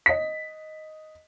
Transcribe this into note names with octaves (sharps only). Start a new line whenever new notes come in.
D#5 B6